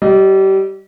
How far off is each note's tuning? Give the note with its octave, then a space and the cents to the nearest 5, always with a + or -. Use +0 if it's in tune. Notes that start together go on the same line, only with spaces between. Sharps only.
G3 -30 D#5 +0